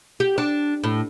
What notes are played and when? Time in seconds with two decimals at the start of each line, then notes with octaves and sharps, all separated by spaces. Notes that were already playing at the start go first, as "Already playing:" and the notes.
0.20 G4
0.38 D4
0.84 A2